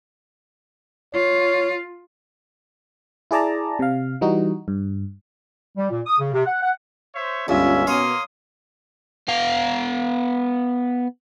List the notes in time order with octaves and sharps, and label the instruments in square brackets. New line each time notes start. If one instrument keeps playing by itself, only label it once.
[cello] F4 [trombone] C#5
[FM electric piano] E4 G#4 D5 A5 A#5
C3 F5
E3 G3 D#4 F#4
G2
[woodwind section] G3
A#2
D#6
C#3
C3
F#5
F#5
[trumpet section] C5 C#5 E5
[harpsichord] C#2 G2 [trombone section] D3 B3 F4 [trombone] C#4 [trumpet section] E4 E5
[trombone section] B2 B3 [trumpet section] A#3 C6 D#6 [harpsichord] C#5 F5
[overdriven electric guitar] B3 F5